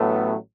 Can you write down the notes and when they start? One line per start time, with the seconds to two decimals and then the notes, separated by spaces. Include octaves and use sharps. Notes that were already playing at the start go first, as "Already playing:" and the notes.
Already playing: A1 A2 F#3 A3 B3